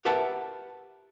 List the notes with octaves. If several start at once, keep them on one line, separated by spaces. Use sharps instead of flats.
G4 A#4 B4 E5 F#5 A5